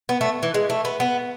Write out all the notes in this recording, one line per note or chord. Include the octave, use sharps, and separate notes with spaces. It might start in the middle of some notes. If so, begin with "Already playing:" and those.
B3
A3
E3
G#3
A3
B3
B3